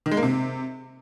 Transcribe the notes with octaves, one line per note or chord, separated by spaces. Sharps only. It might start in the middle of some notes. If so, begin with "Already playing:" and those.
D#3
G#3
A#3
C3